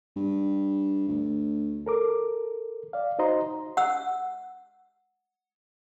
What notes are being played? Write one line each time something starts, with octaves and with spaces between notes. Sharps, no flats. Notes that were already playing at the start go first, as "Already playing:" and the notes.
G2
D2
A4 A#4 D6
D5 F5
D#4 F#4 C5 D#5 A#5 C6
F#5 E6